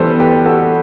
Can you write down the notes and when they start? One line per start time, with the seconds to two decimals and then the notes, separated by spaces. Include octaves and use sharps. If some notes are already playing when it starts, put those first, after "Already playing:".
Already playing: E3 G3 B3 G4 A4 B4 C5
0.20 G4 B4
0.45 F#4 A4